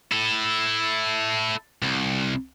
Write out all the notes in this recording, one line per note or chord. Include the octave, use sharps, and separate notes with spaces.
E4 A4
C2